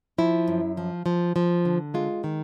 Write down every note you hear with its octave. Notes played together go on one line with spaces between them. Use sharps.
F3 E4
F#2
F3
F3
F3
D3
G#3 F4
D#3